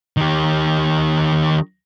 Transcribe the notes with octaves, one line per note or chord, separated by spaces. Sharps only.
D#3 G4